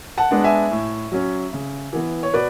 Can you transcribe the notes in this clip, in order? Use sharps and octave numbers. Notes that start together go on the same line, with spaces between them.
F#5 A5
G#3 B3 D4
E5 G#5
A2
F#3 C#4
C#3
E3 B3
C#5
B2 B4 D5